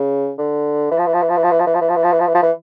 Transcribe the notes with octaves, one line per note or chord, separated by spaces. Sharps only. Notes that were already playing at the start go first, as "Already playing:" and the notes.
Already playing: C#3
D3
E3
F3
E3
F3
E3
F3
E3
F3
E3
F3
E3
F3
E3
F3
E3
F3
E3
F3
E3
F3
E3